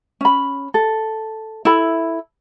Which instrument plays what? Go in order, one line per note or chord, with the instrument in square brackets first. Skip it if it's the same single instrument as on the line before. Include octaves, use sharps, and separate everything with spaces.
[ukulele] C#4 B5
A4
E4 A4 B5